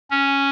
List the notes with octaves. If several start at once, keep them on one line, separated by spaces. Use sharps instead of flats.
C#4